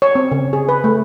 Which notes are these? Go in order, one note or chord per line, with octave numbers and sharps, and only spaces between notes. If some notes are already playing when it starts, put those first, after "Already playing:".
C#5
C4
C#3
G#4
B4
A3